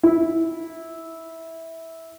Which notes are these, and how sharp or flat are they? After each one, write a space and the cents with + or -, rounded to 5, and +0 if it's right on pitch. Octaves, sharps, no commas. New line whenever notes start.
E4 -15